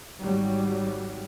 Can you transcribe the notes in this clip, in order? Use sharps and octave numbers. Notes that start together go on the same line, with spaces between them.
G#1 F#3 G3